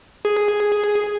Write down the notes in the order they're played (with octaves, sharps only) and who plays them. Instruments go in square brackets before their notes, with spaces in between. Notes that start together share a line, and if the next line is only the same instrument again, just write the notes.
[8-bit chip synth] G#4